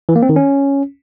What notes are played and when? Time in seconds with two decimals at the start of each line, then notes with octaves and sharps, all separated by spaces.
0.09 E3
0.16 A#3
0.22 C4
0.29 D#3
0.36 C#4